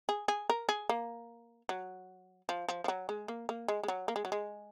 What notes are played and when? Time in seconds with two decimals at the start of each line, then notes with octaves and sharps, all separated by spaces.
0.09 G#4
0.28 G#4
0.50 A#4
0.69 G#4
0.89 A#3
1.69 F#3
2.49 F3
2.69 F3
2.84 F3
2.88 F#3
3.09 G#3
3.28 A#3
3.49 A#3
3.68 G#3
3.83 G#3
3.88 F#3
4.08 A#3
4.16 G#3
4.25 F#3
4.32 G#3